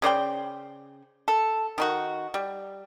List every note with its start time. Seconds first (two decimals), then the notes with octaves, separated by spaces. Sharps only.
0.02 C#3 C5 D5 G5
1.28 A4
1.78 D#3 D#4 F#4
2.34 G3